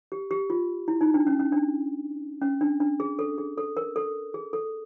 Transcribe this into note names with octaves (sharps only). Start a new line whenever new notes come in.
G4
G4
F4
E4
D#4
D4
C#4
C#4
D4
C#4
D4
D4
G#4
A4
G#4
A4
A#4
A4
G#4
A4